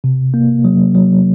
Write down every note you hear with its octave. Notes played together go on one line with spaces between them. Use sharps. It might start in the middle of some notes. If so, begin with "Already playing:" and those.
C3
A#3
F#3
F#3